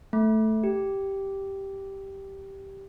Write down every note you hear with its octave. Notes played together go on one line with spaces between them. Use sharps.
A3
G4